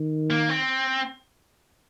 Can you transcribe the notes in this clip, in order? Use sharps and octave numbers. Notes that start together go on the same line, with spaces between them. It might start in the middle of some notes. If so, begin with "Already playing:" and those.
Already playing: D#3
A#3
C4